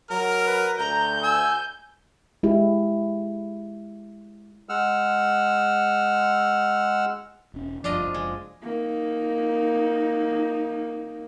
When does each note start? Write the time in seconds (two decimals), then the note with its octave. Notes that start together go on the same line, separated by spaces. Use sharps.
0.10 F#3 A#4 F6
0.46 B4
0.79 D2 A#5 G6
1.23 G#5 E6
2.43 G#3 E4 G4
4.69 G#3 F#5 E6 F6
7.54 E1 C#4
7.84 F#1 D2 G2 F3 D4 F4 D5 D#5
8.14 F#1 G#3
8.63 A#3 D#4